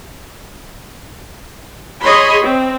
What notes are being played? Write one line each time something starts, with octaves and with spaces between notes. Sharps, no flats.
G#4 C#5 D#5 B5 C6
C4